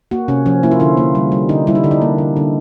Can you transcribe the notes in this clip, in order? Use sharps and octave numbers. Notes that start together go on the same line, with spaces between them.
A#3 F#4
C3 C#4
F3 C#4
A#3 E4
F4
D3 E4
A#3
G3
G3
D3 D#4
G3 E4
D#4
D3 D4
D#4
A#3
D3
D3